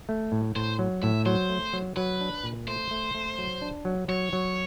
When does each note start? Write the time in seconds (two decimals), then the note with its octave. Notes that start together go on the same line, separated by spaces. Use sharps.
0.09 A3
0.32 A2
0.56 A2 C5
0.79 F#3
1.03 A2 E5
1.26 F#3 C5
1.49 A3
1.73 F#3
1.96 F#3 B4
2.21 D4
2.43 A#2
2.67 A3 C5
2.91 A3
3.15 A3
3.38 F#3
3.62 D4
3.85 F#3
4.08 F#3 C#5
4.33 F#3